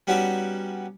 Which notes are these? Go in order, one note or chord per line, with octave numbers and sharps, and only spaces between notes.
G3 B3 C#4 D#4 F#4 G4